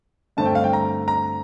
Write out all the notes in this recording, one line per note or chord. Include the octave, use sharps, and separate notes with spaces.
G2 D3 A3 C4 A5
G5
F5
G5
A#5
A#5